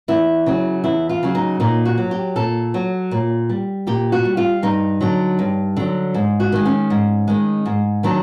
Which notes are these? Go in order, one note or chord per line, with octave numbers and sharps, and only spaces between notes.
E2 E4
C#3 F#3
E2 E4
F4
C#3 F#3
D#4
A#2 D#4
F#4
F#3
G4
A#2 A4
F#3
A#2
G3
A#2 G4
F#4
G3
F4
G2 D#4
D3 F#3
G2
D3 F#3
G#2
F#4
D#3 G#3
C#4
G#2
D#3 G#3
G#2
D#3 F#3 D4